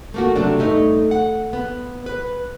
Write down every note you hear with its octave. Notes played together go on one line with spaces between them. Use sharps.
A3 A#3 F#4
C3 F#3 A3 D4
G2 A3 D#4
F#5
B3
B4